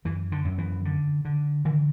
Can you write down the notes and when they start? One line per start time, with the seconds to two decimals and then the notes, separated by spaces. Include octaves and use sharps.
0.05 F#2 E3
0.32 D3
0.45 F#2
0.58 E3
0.85 D3
1.25 D3
1.65 D3 E3